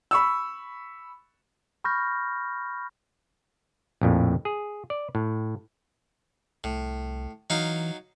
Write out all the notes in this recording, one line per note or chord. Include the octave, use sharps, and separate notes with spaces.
B5 C#6 E6
B5 C#6 F6 G6 A#6
A#1 F2 A2
G#4
D5
A2
C2 A2
E3 F#3 D#4 F5